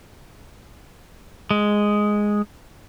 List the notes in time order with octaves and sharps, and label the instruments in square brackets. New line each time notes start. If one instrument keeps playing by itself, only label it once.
[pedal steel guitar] G#3